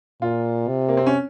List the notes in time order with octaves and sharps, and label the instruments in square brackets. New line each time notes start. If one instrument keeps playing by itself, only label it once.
[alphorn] A#2 [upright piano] F4
[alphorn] C3
[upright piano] A#3
C4
C#4